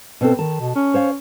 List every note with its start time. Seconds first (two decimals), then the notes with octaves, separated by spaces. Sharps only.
0.21 B2 C4 A4
0.39 D#3 A5
0.60 B2
0.76 C#4
0.94 C5 C#5 F5